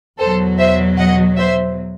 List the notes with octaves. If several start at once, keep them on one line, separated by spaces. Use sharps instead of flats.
E2 B2 F#3 A4 C5
C5 E5
D#5 F#5
C5 E5